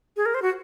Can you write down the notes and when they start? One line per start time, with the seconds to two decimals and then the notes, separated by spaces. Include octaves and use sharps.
0.17 G#4
0.26 A#4
0.34 C5
0.42 F#4